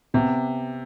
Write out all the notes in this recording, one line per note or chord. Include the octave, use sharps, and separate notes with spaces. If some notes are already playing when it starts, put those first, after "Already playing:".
C3 B3